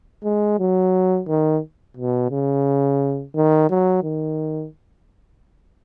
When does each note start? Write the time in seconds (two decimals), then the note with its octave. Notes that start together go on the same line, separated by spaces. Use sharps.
0.24 G#3
0.59 F#3
1.28 D#3
1.97 B2
2.31 C#3
3.36 D#3
3.70 F#3
4.04 D#3